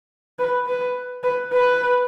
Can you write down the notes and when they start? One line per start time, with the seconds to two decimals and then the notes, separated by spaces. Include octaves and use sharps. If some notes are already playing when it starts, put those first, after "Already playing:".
0.39 B4
0.67 B4
1.23 B4
1.52 B4